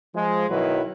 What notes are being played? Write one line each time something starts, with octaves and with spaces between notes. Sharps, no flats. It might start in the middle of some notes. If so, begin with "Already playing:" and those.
F3 G#3
B1 D#3 F#3 E4 F#4 B4